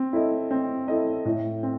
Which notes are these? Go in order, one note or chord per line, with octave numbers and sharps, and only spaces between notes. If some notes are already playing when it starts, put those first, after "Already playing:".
Already playing: C4
E4 A4 D#5
C4
E4 A4 D#5
A2
C4